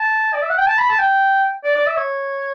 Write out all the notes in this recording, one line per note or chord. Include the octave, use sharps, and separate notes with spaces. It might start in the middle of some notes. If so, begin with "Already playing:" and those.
Already playing: A5
D5
E5
F#5
G5
A5
B5
A5
G5
D5
D5
E5
C#5